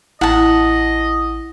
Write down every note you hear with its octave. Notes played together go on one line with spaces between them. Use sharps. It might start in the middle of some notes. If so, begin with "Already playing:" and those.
A1 E4 D#5 F#5 A5